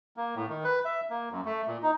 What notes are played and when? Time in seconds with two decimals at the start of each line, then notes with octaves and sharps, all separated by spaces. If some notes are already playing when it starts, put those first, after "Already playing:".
0.17 A#3
0.35 A2
0.49 D#3
0.64 B4
0.85 E5
1.10 A#3
1.32 F#2
1.45 A3
1.67 A#2
1.83 D#4